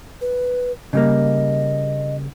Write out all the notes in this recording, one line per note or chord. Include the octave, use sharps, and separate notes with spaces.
B4
C#3 G3 A#3 D#5